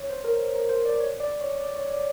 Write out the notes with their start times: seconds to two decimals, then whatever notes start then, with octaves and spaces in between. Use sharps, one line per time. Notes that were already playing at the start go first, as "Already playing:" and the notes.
Already playing: C#5
0.10 C5
0.24 A#4
0.55 A#4
0.69 C5
0.85 D5
1.00 C#5
1.20 D5
1.41 C#5
1.60 D5
1.75 C#5
1.90 D5